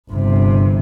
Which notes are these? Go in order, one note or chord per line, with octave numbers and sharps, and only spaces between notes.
G1 C3